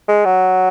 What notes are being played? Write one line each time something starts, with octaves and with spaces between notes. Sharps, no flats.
G#3
F#3